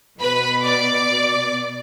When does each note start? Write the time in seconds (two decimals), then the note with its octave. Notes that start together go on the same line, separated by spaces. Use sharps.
0.20 B2 B4 B5
0.63 D5 D6